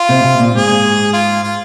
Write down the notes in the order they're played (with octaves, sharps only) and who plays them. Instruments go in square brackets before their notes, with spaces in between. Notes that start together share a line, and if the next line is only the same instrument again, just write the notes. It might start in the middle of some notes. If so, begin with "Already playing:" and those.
Already playing: [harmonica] F4
[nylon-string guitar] C3
C3
A#2
[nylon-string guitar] G#2 [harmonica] G#4
[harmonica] F4
F4